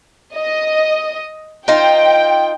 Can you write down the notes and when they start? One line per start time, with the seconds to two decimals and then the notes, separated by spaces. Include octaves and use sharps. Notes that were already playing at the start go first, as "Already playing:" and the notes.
0.36 D#5
1.68 D#4 F4 C5 G5